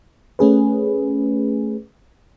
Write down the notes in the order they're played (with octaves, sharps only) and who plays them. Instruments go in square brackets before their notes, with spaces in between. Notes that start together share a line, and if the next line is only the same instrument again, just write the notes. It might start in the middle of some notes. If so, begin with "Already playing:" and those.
[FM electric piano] A3 C#4 G#4 B4